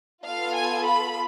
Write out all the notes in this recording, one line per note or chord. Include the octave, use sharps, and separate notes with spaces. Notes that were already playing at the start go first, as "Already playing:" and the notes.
B3 F4 A4 F5
G#5
B5